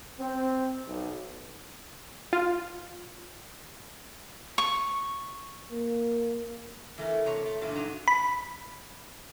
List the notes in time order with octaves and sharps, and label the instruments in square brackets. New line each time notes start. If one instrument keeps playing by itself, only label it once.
[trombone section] C4
B1
[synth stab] F4
[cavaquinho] C#6
[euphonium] A#3
[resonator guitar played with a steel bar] E3 A3 A#4
C3 A3 C#5 A#5
A3
G2 A#2 D3 E3 A3
G2 A#2 F#3 D#4 A#5
[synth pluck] B5